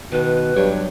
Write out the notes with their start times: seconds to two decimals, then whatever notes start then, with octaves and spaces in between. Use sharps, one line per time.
0.12 B2 D#3 B4
0.56 G2 F#3 G4 C#5